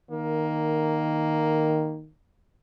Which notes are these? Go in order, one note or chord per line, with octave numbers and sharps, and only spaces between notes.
D#3 A#3